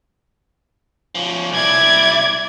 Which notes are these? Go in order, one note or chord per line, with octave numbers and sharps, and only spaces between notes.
F3 C#4
C2 E4 D5 G#6